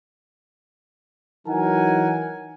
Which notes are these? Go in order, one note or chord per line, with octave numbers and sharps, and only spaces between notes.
E3 F#3 D#4 A#4 F#5 G#5